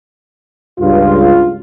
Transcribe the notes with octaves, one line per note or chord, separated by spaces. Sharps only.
C#2 G2 F4